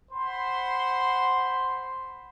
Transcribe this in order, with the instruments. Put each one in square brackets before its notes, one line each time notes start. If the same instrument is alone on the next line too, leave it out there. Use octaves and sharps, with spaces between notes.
[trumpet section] C5 F#5 B5 C6